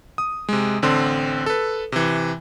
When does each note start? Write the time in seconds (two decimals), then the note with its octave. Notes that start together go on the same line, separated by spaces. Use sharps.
0.18 D#6
0.49 C3 G#3
0.82 A1 D3 C4 C6
1.46 A4 B4
1.92 C3 E3